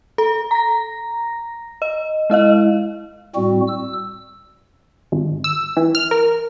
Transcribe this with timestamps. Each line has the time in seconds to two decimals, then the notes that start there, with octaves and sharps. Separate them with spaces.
0.18 A4
0.51 A#5 A#6
1.82 D#5
2.30 G#3 E4 D#5 F5
3.35 A2 G3 C4 F#4
3.67 E6
5.12 G#1
5.44 E6
5.77 E3
5.95 F6
6.11 A#4